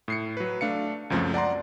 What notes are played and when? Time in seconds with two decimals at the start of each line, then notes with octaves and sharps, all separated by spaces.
0.08 A2 C7 C#7
0.37 F#3 B4
0.61 A3 D4 F5 C#7
1.10 C#2 F#2 F3 F#3 A3 C4
1.34 D5 F#5 A#5 C6